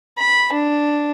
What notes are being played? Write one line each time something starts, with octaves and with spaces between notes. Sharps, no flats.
B5
D4